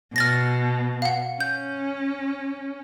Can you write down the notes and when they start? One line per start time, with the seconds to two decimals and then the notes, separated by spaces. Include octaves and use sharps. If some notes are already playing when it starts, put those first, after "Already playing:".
0.16 B2 F6 A6 A#6
1.02 F5 F#5
1.40 C#4 G6